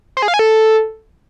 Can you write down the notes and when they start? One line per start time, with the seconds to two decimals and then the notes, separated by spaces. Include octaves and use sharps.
0.17 C5
0.22 G#4
0.28 F5
0.34 G#5
0.39 A4